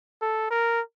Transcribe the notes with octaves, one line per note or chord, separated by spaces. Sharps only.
A4
A#4